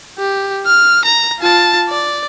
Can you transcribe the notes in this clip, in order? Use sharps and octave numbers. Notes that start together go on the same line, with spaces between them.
G4
F6
A#5
F4 A5
D5